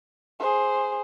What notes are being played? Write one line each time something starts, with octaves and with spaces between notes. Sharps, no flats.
G#4 C5